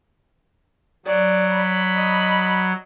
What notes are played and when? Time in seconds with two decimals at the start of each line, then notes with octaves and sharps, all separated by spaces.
1.06 F#3 D5
1.53 B5
1.95 D#5